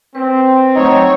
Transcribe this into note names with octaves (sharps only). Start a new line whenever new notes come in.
C4 B4
F#3 A3 D#4 C#5 G5